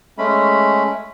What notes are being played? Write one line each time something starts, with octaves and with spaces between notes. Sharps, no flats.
G#3 A3 C#4 B5